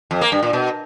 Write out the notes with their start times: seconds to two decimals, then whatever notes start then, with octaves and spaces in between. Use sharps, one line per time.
0.11 F2
0.21 A#3
0.32 G2
0.43 A#2
0.53 B2